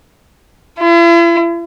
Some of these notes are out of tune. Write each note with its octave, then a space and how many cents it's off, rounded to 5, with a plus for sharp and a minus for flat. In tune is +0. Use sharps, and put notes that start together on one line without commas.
E4 +45